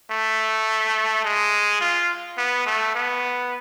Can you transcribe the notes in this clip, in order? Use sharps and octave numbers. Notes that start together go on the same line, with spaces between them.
A3
G#3
F4
B3
A3
B3